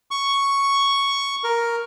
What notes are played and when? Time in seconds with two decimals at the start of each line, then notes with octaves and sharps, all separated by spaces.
0.11 C#6
1.44 A#4